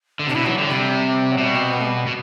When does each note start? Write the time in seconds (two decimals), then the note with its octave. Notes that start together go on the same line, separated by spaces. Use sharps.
0.19 D3
0.27 C3 D4
0.35 B2 E4
0.46 E3 F#3
0.58 D3 G3
0.69 C3 G3
1.31 F#3
1.38 B2 G3
1.55 C4
1.72 B3
1.80 A3
1.84 G3
2.07 B2